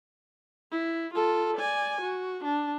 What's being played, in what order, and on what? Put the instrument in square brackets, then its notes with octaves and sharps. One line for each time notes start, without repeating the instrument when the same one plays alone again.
[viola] E4
F4 A4
D5 G#5
F#4
D4